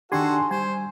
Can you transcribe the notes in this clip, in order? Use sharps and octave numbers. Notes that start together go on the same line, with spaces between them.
D#3 D4 F#4 G4 A4 G#5 C6
G3 C5 G#5